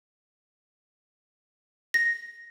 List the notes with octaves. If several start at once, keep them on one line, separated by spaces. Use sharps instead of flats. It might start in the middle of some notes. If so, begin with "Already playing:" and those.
A#6